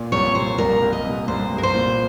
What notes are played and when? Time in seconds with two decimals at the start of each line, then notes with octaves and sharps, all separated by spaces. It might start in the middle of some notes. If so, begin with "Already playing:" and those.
Already playing: A#2
0.12 C2 C#5
0.35 C2 C5
0.58 C2 A#4
0.82 C2
0.93 D#5
1.04 C2
1.28 C2 C5
1.52 C2
1.58 A#4
1.63 C5
1.75 A#2